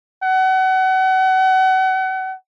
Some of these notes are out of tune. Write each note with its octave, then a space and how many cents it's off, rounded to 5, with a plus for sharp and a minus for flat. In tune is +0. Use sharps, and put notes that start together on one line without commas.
F#5 +30